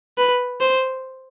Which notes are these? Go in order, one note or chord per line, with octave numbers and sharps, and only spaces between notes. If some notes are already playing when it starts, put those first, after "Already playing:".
B4
C5